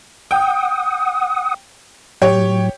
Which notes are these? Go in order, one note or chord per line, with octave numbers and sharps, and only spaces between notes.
F#5 G5 D#6
A2 F#3 G4 C#5